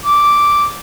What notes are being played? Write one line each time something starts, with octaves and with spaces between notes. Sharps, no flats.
D6